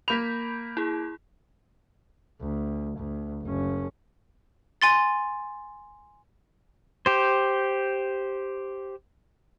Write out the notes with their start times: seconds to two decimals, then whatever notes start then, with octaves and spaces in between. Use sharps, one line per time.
0.08 A#3 B5 G6 B6 F7
0.77 E4 G#4
2.41 D2
2.97 D2
3.43 F#1 C#4
4.82 G#5 C6 A6
7.06 G4 C5